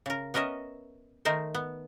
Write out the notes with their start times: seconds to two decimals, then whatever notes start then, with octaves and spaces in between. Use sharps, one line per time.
0.06 C#3 A#4
0.34 B3 C#4 A#4 D#5 E5
1.25 D#3 A3 D#4 A#4 C5
1.54 B3